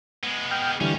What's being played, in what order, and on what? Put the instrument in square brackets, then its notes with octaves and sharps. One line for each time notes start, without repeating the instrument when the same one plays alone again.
[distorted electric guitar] G#3 B3
[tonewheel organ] G5 F6
[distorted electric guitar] D2 C#4 [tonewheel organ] D3 E3 G3